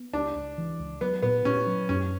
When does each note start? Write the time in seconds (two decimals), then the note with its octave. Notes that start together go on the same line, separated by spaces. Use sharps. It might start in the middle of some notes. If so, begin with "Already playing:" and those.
Already playing: B3
0.13 C#2 D4
0.36 C#2
0.58 E3
0.79 C#2
1.01 F#3 B3
1.23 A#2 B3
1.45 A#2 C#4
1.67 F#3
1.89 F#2 C#4